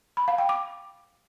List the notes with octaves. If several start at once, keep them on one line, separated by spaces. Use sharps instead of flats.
B5
F5
G5
D6